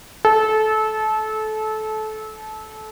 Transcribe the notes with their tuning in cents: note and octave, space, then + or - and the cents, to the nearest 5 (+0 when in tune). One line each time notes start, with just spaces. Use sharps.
A4 -25